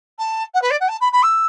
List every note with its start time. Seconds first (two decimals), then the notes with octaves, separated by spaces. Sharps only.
0.19 A5
0.54 F#5
0.62 B4
0.70 D5
0.80 F#5
0.88 A5
1.00 B5
1.12 B5
1.22 E6